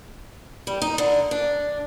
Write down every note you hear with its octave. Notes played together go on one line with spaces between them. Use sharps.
G3
D#4
D3
D4